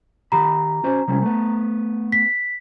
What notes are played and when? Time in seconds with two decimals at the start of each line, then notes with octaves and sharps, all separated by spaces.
0.32 D#3 G4 A#5 B5
0.84 C#4 F#4 C5
1.08 C3 G3 C#4
1.22 A3 B3
2.12 B6